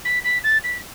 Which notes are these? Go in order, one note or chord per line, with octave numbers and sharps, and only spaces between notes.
B6
B6
A6
B6